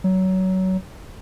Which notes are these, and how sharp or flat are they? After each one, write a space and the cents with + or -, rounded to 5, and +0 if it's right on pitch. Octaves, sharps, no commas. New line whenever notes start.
F#3 +20